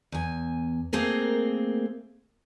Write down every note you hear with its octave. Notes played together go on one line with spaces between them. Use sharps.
E2 G#5
A3 A#3 C4 G#4 A#4